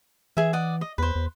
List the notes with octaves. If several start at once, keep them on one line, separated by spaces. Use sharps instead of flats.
E3 G#4 E5
D5 D#5 F#5
D#5
E2 B4 C5
E2